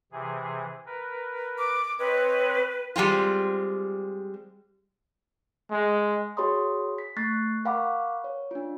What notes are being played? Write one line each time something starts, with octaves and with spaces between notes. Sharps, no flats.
C3 E3 G#4
A#4 B4
D6
C4 B4 C#5 D#5
G3 G#3 C4 F4
G#3
F#4 G#4 C#5 B5 C6 D#6
B6
A3 C#6 F#6 A6 C7
A#4 F5 F#5 B5 C#6 D6
C#5
D4 F4